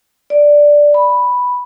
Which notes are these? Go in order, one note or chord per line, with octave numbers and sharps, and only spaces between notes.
D5
B5